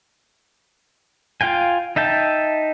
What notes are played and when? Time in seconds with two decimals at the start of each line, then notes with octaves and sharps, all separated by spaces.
1.41 F4 F5 G5 G#5
1.96 D#4 E5 G5 A5